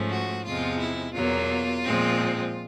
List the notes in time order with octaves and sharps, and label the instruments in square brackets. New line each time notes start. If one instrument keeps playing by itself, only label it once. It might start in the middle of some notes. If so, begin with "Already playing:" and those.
Already playing: [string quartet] G#2 F3 A3 C#4
F#4
E2 C3 F3 G#3 F4
E4
E2 B2 F#3 A#3 F4
A#2 F3 G#3 C4